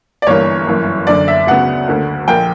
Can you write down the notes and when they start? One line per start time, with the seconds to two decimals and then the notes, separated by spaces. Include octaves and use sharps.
0.22 D5
0.27 G1 G2 E3 A#3 C#5
0.66 G1 F#2 E3 A#3
1.07 F#1 F#2 D3 D5
1.28 E5
1.47 D2 C#3 F#3 B3 F#5
1.87 D2 D3 A#3
2.28 A#1 A#2 A#3 G5